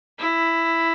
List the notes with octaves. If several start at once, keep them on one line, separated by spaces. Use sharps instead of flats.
E4